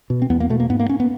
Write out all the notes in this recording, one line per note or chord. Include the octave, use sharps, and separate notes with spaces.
B2
C4
E2 B3
A#3
B2 A3
A#3
G#2 B3
A#3
C#4
B3